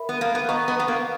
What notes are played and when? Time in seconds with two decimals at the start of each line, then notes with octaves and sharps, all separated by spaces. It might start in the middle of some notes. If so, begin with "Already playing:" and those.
Already playing: A#4 E5 B5
0.09 B3
0.21 A#3
0.35 B3
0.48 B3 B4 D#5 A#5 C#6
0.68 B3
0.79 B3
0.88 A#3